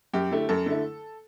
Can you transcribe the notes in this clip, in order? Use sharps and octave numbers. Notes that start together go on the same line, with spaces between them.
F#2 G4
D3 A3 E4
F#2 A4
D3 A3 E4